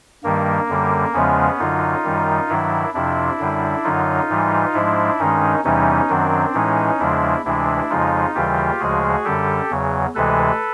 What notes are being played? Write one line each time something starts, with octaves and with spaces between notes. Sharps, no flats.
G2 D#3 G3 A#3
F#2 D3 G3
E2 C#3 F3 G#3 B3 C#4
F#2 D3 F#3 D#4 F4
F#2 D#3 G3
G2 D#3 F#3 D4 E4
F2 C3 F3 D4 E4
F#2 D3 G3
F#2 D3 F#3 D#4 F4
G#2 E3 G3
G#2 F3 G#3 D4 E4
G2 D#3 G#3 C#4 D#4
E2 C3 E3 G3 C#4 D#4
F#2 D#3 F#3 C4 D4
A2 E3 G#3 C#4 D#4
E2 C#3 F3 G#3 D4 E4
D2 C3 E3 G#3 D4 E4
F2 C#3 F3 G#3 D#4 F4
D#2 C#3 E3 G3 F4 G4
D2 C#3 F3 G#3 F#4 G#4
F#2 D3 G3 G4 A4
E2 C#3 F#3
D2 C3 E3 G#3 A4 B4